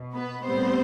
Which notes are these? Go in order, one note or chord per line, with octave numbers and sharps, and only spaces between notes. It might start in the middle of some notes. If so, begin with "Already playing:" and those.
Already playing: B2
B3 B4
A2 G3 B3 C4 C5